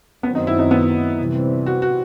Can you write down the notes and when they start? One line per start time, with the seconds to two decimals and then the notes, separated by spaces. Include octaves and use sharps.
0.23 F#2 D#3 F#3 B3 C4
0.35 D#4
0.47 E4
0.59 D#4
0.71 B3
1.18 C3 E3 G3 C4
1.66 F#4
1.82 F#4